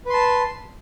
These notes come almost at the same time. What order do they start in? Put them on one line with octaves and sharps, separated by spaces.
B4 C6 A5